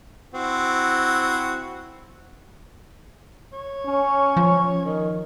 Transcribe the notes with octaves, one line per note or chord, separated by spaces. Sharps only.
C4 E4 F#4
C#5
C#4
F3
D#3